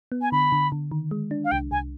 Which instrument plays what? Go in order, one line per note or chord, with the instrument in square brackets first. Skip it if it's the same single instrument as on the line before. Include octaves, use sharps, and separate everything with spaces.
[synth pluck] B3
[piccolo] G#5
[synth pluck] D3 [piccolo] B5
[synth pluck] D3
D3
D#3
G#3
D4
[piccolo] F5
[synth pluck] C2 [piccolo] G5
[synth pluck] C2 [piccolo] G#5